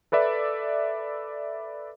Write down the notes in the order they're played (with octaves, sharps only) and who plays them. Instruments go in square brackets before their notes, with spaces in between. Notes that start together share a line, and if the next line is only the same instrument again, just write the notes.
[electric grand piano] A4 B4 D5 E5